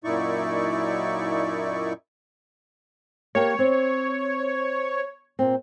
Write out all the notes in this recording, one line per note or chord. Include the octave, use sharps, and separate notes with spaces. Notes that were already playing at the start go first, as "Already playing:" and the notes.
F#2 A#2 D#4 E4 D5 C#6
A#3 G4 C#5 A5
C4
A#2 C4